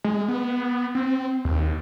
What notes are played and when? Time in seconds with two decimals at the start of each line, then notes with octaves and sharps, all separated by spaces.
0.04 G#3
0.28 B3
0.95 C4
1.45 D#2